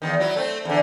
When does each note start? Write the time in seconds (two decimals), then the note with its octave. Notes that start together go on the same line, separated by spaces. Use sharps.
0.02 E2 B2 D#3
0.20 F#3 E4
0.36 A3 C4
0.65 E2 D3